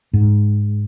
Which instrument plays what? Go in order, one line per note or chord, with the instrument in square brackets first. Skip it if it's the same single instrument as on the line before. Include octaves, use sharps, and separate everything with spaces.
[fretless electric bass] G#2